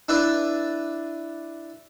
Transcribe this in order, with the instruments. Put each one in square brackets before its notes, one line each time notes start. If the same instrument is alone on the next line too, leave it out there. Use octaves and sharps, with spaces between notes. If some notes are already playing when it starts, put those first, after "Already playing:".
[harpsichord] D4 E4 B4 D5